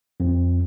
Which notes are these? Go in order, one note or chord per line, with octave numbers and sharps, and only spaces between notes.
F2